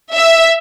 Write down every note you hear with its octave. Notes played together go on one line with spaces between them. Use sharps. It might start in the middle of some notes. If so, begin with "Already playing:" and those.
E5